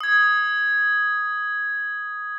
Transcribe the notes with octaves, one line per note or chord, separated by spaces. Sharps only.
D#6 G#6